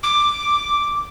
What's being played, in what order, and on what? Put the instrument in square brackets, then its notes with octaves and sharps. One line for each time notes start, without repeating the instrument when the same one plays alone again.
[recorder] D6